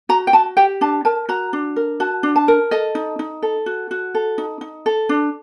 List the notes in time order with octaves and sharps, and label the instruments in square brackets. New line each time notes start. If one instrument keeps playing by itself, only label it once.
[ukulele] F#4 A#5
G5
F#4 A5
G4 G5
D4 A5
A#4 A5
F#4 A#5
D4
A#4
F#4 A5
D4
A5
A#4
A4 D#5
D#4
D#4
A4
F#4
F#4
A4
D#4
D#4
A4
D4